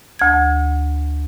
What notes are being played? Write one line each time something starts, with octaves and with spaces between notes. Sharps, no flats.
D2 G#6